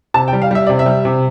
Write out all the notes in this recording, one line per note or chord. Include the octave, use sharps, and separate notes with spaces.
C3 A5
G5
G3
F5
G3 E5
C3 D5
E5
G3
C3